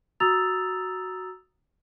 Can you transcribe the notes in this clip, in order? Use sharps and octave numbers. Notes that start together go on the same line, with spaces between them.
F#4 A#5 D#6 E6 A6 F7